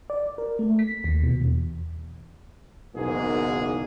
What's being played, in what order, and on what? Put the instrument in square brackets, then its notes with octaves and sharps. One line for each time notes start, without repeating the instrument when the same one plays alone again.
[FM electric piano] D5
A#4
A3
B6
D#2
B2
E2
[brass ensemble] F#1 B1 E2 G#2 A#3 G#4